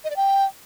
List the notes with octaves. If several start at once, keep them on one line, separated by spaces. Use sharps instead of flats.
D#5
D5
G5